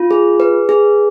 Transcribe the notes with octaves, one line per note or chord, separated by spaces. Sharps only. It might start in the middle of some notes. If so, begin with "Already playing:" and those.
Already playing: F4
G#4
B4
G#4